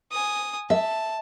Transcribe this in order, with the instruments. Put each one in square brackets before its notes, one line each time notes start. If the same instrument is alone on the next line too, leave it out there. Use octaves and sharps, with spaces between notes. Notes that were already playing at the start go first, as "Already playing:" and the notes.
[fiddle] G#5 D#6
[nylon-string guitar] E5 [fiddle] A5